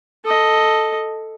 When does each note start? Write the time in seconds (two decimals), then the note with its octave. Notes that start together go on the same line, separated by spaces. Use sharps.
0.25 A4 D#5